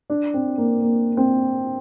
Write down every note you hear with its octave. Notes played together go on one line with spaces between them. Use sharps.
D4
C4
A#3
A#3
C4